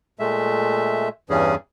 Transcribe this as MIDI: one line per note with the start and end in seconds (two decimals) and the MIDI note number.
0.19 1.09 46
0.19 1.09 56
0.19 1.09 57
0.19 1.09 76
1.30 1.55 40
1.30 1.55 43
1.30 1.55 52
1.30 1.55 55
1.30 1.55 61
1.30 1.55 68